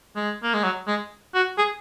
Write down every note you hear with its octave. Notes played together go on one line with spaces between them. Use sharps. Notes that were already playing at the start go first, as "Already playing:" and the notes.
G#3
A#3
G#3
F#3
G#3
F#4
G#4